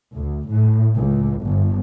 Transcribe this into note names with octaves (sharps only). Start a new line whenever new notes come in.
D2
A2
C#2
G1